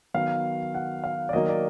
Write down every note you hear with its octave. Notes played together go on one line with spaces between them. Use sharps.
D#3 F#3 B3 F5
F#5
F5
D5
D#3 F#3 A#3 D#5
D5